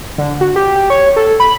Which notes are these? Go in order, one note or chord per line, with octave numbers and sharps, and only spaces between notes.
D3
F#4
G4
G4
C#5
A4
B5